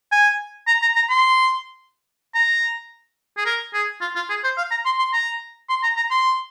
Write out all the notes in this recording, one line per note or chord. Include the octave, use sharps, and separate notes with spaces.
G#5
A#5
A#5
A#5
C6
A#5
G#4
A#4
G#4
F4
F4
G#4
C5
F5
A#5
C6
C6
A#5
C6
A#5
A#5
C6